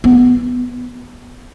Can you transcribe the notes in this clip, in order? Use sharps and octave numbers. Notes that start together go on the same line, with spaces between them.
B3